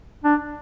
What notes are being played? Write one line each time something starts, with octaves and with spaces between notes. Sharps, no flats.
D4